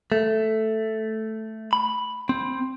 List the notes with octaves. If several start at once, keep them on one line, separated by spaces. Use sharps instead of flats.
A3
B5
C4